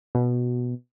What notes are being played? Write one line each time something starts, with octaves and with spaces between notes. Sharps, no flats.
B2